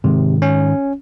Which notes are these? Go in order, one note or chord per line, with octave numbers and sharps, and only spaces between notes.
G#2 C3 D#3 G#3
C#4